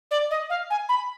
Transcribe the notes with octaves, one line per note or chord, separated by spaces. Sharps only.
D5
D#5
F5
G#5
B5